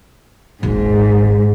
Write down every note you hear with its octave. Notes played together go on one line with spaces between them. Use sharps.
D#1 G#1 G#2